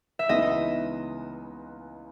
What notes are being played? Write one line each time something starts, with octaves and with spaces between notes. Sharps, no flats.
E5
C#2 C#3 E3 B3 D#4 D#5